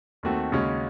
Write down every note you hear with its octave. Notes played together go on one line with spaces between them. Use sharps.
D#2 D#3 A3 C4 F#4
D#2 C#3 G#3 C#4 F#4